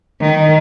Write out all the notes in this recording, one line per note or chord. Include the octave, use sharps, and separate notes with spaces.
D#3